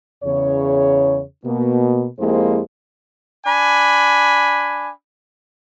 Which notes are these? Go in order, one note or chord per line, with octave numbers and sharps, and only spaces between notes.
E2 C#3 C#5
B2 A#3
F2 G#3 A#3 E4 G4 C5
D4 G#5 B5